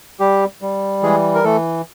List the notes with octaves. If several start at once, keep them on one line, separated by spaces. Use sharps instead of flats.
G3 G4
G3
E3 G#3 G#4
A#4
E3 A3 A4